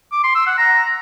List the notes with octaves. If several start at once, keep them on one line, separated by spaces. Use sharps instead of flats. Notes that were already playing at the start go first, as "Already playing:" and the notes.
D6
C6
E6
F#5
A#5